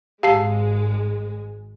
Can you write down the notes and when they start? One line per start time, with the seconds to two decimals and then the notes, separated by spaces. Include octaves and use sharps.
0.23 G#1 G#3 G4 F5 A5 C7